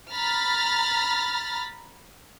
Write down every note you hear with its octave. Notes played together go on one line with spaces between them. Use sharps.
A#5 B5 F6 A6